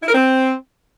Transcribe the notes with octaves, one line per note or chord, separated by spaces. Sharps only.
E4
A#4
C4